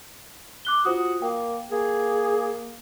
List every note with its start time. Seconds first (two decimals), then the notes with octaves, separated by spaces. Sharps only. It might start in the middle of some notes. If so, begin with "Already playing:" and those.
0.65 D6 F#6 G7
0.85 F4 F#4 C5 D#6
1.22 A#3 G5
1.72 A#3 G#4